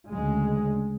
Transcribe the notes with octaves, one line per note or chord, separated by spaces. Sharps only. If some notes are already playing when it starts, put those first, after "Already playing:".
D2 C#3 G#3